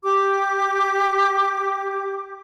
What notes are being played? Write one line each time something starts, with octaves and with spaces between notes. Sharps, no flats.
G4 D6